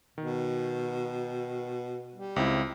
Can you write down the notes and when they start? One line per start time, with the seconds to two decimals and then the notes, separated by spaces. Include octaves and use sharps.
0.18 B2 D#3
2.15 G3
2.36 C#2 C4 E4